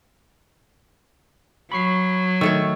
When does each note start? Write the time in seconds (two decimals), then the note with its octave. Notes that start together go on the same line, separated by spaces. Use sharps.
1.72 F#3 B5 C#6 C7
2.41 D#3 A3 C#5 C#6 E6